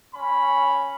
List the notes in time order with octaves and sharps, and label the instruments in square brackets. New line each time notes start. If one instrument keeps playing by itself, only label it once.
[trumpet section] C#4 B5